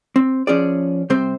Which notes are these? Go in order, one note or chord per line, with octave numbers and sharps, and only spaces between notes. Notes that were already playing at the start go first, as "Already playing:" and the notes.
C4
F3 C#4 G#4 D5
C3 G3 C4 C5